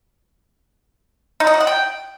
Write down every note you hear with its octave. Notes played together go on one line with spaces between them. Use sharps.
D#4
D#5
F#4
F#5
G5